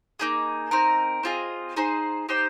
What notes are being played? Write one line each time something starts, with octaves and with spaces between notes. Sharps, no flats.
A#3 D#4 G#4
C4 D#4 A#4
C4 F4 G#4 D#5
D#4 G#4 C5
D#4 G4 C5 G5